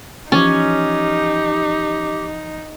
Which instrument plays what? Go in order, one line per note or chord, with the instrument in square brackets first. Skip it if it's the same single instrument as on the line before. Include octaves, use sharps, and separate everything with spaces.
[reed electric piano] E3 F3 [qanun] C#4 [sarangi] D#4 [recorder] G4